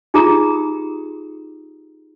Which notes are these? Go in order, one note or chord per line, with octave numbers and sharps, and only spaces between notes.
D#4 F4 G4 G#4 A#5 D#6